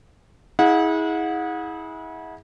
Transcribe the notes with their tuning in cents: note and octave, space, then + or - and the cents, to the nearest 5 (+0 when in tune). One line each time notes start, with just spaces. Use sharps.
E4 -35 G#4 +0 F#5 -30